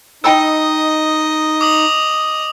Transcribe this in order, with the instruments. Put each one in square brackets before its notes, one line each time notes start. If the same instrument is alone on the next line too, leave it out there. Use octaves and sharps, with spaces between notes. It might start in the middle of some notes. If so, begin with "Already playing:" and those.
[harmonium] D#4 [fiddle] D#5 [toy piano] G5 B5 E6
[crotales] D6 D#6 F#7